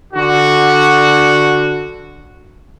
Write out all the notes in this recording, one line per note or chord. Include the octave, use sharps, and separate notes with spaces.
D3 F#4